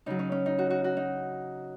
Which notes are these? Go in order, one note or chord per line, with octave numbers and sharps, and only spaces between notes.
C#3 F#3 D#4
C#4
C#4
D#4
F#4
F#4
F#4
D#4